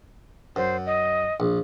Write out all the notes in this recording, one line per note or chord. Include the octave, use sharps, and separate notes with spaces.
F#2 C5
D#5
A#1